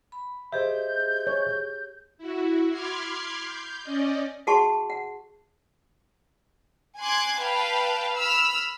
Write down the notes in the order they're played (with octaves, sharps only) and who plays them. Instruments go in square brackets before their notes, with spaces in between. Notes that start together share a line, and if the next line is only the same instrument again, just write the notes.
[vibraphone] B5
[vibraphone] G4 G#4 [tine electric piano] C5 D#5 E5 [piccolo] G6
[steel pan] C#5
[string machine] E4 F#4
B5 C6 D6 F6 G#6 C7
G6
C#4 D5 D#5
[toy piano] F#4 G#4 F#5 A5 C6 C#6
F#5
[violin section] G#5 C6 D6 F#6 G#6
B4 F5 G5 A5
B5 E6 F6